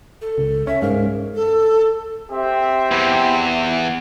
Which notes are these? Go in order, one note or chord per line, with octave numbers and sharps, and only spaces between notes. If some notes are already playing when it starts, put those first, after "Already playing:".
A4
C#2
C#4 E5
G#2 A#4 F5
A4
C4 G4 E5
E2